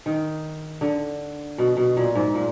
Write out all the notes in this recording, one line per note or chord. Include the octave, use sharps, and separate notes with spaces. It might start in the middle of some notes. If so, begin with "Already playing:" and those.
D#3
D3
B2
B2
A#2
G#2
A#2